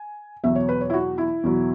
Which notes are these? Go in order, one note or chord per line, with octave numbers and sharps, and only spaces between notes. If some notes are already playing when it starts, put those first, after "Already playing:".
Already playing: G#5
E2 B2 F#3 E5
C#5
B4
C#5
E4
F#4
E4
E2 B2 F#3